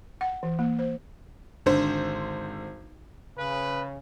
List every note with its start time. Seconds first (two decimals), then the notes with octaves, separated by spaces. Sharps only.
0.21 F#5
0.43 E3
0.59 A#3
0.79 C5
1.66 G#1 D3 C5
3.37 C#3 B4